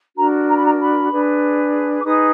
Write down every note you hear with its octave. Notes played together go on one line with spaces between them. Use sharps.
D4 F#4 A#4 A#5
A#5
B5
A#5
B5
D4 G#4 B4
D6
D#4 G#4 B4 D#6